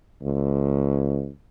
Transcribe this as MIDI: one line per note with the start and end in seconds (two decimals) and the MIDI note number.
0.23 1.29 37